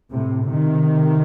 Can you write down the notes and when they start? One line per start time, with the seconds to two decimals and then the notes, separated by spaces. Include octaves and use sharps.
0.10 A2 C3
0.46 C3 D#3